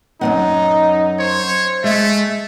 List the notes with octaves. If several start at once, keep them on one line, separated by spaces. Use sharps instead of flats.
F#2 F3 D#4 F#5
C5 C#5
G#3 A3 E5